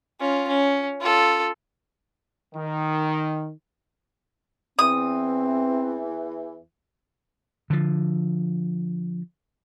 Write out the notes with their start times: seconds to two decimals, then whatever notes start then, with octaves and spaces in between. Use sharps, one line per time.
0.20 C#4 F4
0.48 C#4
1.01 F4 A4
2.55 D#3
4.79 E2 E3 C4 D#6
7.70 D3 F3